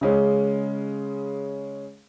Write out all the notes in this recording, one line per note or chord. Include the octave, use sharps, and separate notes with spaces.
C#3 G#3 C#4